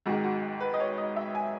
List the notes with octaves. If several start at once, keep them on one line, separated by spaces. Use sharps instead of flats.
G#1 G#2 D#3 G#3 F#4
F#4
B4
D#5
C#5
D#5
E5
G#5